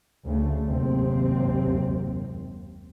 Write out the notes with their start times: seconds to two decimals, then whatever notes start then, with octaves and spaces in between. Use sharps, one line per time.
0.26 D2 C#3 A3
0.65 F#1 D#2 G#2 C3 C4